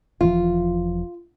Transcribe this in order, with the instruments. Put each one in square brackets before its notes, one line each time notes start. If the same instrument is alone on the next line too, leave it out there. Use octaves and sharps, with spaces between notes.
[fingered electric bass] E1 E3 F3 [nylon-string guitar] F4